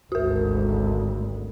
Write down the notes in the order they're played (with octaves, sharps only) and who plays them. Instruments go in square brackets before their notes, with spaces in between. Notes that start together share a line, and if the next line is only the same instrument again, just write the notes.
[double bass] G#1 D2 [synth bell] F#4 A#4